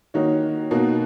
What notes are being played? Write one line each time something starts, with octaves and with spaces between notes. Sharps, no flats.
D#3 A#3 D#4 F#4 C#5
B2 A#3 D#4 F#4